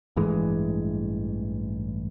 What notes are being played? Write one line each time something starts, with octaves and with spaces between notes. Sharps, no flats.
A1 G2 E3 G#3